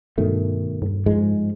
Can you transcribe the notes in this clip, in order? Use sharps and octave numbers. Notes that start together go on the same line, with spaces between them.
G2 B2 D#3 A3
G2
G#2 F3 G#3